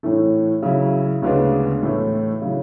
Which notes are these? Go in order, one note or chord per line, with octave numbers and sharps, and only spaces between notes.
A2 E3 A3
C#3 F#3 C#4 E4
D2 C#3 G#3 B3 D4
A2 E3 A3
C#3 F#3 C#4 E4